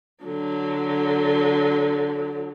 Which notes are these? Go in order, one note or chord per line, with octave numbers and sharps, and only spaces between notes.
D3 F#3